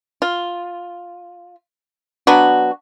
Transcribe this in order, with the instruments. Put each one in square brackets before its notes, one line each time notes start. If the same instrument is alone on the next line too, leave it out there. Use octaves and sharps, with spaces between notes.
[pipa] F4
F#3 B3 D4 F#4